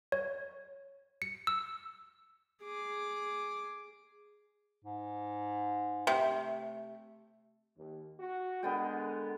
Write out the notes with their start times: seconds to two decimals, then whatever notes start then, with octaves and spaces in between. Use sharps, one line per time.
0.12 C#5
1.22 C#7
1.47 E6
2.63 G#4 D6
4.84 G#2
6.07 C3 A3
7.77 D#2
8.19 F#4
8.63 D3 G#3 B3 A#4 G5